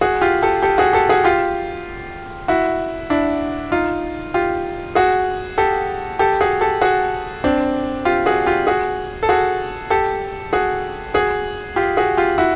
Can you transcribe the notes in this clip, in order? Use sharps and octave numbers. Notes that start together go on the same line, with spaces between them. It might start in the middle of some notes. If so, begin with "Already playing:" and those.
F#4 G#4
F4 G4
G4 A4
G4 A4
F#4 G#4
G4 A4
F#4 G#4
F4 G4
E4 F#4
D4 E4
D#4 F4
F4 G4
F#4 G#4
G4 A4
G4 A4
F#4 G#4
G4 A4
F#4 G#4
C4 D4
F4 G4
F#4 G#4
F4 G4
F#4 G#4
A4
F#4 G#4
G4 A4
F#4 G#4
F#4 G#4
F4 G4
F#4 G#4
F4 G4
E4 F#4